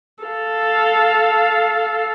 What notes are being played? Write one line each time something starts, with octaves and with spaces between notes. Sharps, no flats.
A4 F5